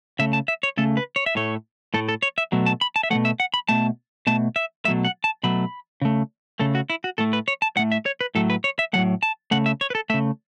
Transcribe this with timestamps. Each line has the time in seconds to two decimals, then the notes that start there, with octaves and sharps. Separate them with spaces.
0.19 C#3 A3 E5
0.33 A5
0.48 E5
0.63 C#5
0.77 C#3 A3 A4
0.97 B4
1.16 C#5
1.26 E5
1.35 A2 A3 C#5
1.94 A2 A3 A4
2.09 A4
2.23 C#5
2.38 E5
2.52 B2 F#3 A3
2.66 A5
2.81 B5
2.96 A5
3.03 E5
3.10 F#3 A3 F#5
3.15 B2
3.25 E5
3.40 F#5
3.54 B5
3.68 B2 A3 A5
4.27 B2 A3 A5
4.56 E5
4.85 B2 F#3 A3 E5
5.05 F#5
5.24 A5
5.43 B2 F#3 A3 B5
6.01 C#3 A3
6.60 C#3 A3 A4
6.75 F#4
6.90 E4
7.04 F#4
7.18 A2 A3 A4
7.33 B4
7.48 C#5
7.62 A5
7.76 A2 A3 F#5
7.92 E5
8.06 C#5
8.21 B4
8.35 A2 F#3 A3 A4
8.50 B4
8.64 C#5
8.79 E5
8.93 A2 F#3 A3 F#5
9.23 A5
9.51 C#3 A3 F#5
9.66 E5
9.81 C#5
9.90 B4
9.95 A4
10.10 A3 E5
10.14 C#3